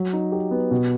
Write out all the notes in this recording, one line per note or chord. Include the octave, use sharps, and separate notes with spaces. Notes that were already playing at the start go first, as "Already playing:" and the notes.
Already playing: F#3
D#4
G4
B3
B2